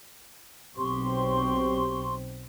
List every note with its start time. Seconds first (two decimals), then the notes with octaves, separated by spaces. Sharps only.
0.76 B1 C4 G4 C6 C#6